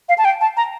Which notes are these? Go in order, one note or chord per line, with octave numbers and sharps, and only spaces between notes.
F5
A5
G5
A5
A#5